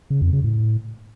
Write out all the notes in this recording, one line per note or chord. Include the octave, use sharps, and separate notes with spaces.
C#3
F2
C#3
A2